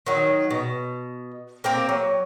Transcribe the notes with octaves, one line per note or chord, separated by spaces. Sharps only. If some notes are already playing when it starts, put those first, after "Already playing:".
D#3 F#3
B2
A#3 C4 A#4
F#3